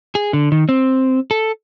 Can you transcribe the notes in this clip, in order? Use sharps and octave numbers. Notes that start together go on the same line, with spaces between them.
G#4
D3
D#3
C4
A4